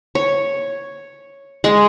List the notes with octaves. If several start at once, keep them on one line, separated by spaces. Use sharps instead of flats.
C#5
G#3